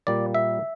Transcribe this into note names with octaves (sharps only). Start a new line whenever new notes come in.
A#2 G3 A#3 D5
E5